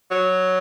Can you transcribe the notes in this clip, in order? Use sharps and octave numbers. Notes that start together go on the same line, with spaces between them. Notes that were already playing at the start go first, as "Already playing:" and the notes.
F#3